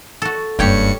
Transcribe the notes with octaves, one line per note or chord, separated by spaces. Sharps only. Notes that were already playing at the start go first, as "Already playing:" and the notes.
F#4 A4
F#1 G2 G4 C#5 G5 C#7